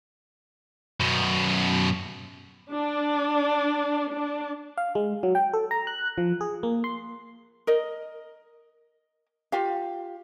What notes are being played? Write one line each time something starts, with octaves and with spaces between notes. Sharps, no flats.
F#2 B2
D4
D4
F5
G#3
F#3
G5
A4
A#5
F#6
F3
G#4
A#3
C6
A#4 D#5
F4 G4 F5